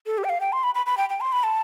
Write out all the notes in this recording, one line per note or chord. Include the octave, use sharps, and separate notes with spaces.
A4
G4
G5
F5
G5
C6
B5
B5
B5
G5
G5
C6
B5
A5